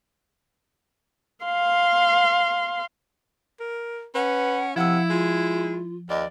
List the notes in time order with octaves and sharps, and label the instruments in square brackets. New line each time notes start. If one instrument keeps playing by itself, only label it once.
[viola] F5 C6
[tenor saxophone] A#4
[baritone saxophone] C#4 [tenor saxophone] B4 [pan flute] F#5
[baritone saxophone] C3 [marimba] F3 E6 [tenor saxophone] E4 [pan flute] F#5
[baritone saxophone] G#3 [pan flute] F4
[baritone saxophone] D#2 [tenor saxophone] D5 [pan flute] D#5